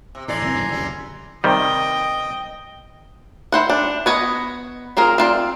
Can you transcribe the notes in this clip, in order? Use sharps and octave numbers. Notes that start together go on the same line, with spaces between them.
C3
A2 E3 D4 D5 G#5 A#5 C6
F#1 C4
D#1 F#2 C3
F#1 D2 C#3 G3
C3 D#3 G3 D#5 G5
E4 C5 F#5
D4
B3 C#5 D#5
C4 F4 G#4 A#4
C4 F4 D5